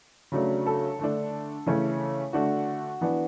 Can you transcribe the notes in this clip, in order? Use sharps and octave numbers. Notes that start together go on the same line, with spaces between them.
C#3 F#3 A3 D4
A4
D3 A3 D4
C#3 E3 A3 C#4
D3 A3 D4 F#4
E3 B3 D4